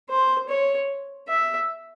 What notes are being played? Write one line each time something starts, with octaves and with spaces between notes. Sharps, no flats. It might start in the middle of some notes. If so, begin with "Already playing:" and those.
C5
C#5
E5